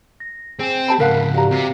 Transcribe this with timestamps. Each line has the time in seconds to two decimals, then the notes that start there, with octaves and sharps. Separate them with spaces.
0.20 A#6
0.60 C4 G#4 G5 G#5
0.88 G4 A5 B5
1.00 C#2 G#2 A#4 F5 F#5 F#6 B6
1.34 F#4 G4 D5 F5 A#5
1.51 C3 F#4